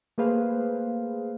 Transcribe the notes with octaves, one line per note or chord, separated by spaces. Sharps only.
A3 A#3 G#4 B4 C5 F5